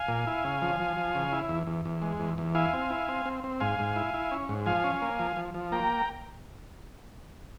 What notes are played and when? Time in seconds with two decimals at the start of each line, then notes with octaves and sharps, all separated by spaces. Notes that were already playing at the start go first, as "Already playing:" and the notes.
Already playing: F5 G#5
0.08 A#2
0.27 E4
0.45 C#3
0.62 F3
0.80 F3
0.97 F3
1.15 C#3
1.33 E4
1.49 E2
1.67 E2
1.85 E2
2.02 G#3
2.20 E2
2.38 E2
2.55 E4 F5 G#5
2.73 C4
2.90 E4
3.08 C4
3.26 C4
3.44 C4
3.60 G#2 F5 G#5
3.79 G#2
3.96 E4
4.14 E4
4.31 C#4
4.49 G#2
4.66 F3 F5 G#5
4.84 C#4
5.02 A#3
5.19 F3
5.36 F3
5.54 F3
5.72 A#3 G5 A#5